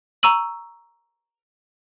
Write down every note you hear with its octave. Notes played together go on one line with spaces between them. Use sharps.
A#5 C#6 E6 D#7 F#7